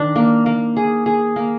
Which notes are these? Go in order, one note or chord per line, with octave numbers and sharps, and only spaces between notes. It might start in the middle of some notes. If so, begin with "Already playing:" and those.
Already playing: D#3 D4
A#3
A#3
G#4
G#4
A#3